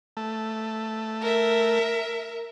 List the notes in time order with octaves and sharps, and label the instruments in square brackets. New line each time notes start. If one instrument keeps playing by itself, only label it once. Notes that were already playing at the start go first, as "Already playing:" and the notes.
[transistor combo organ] A3
[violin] A#4 E5